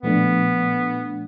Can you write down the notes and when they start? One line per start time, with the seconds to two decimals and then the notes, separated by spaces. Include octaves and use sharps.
0.03 A#2 F3 A3 B3 D4